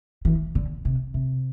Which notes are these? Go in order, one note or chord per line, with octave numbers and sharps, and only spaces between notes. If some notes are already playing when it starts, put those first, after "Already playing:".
E3
D3
C3
C3